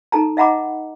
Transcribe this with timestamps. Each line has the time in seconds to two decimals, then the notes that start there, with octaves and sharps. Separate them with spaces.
0.12 D#4 A4 A5 A#5
0.37 D#5 E5 F#5 A#5 B5 D6